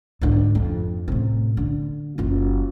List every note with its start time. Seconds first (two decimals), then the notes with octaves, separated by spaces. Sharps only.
0.21 G#2 D3
0.55 F2
1.08 A2 C3
1.57 D3
2.18 F#1 F4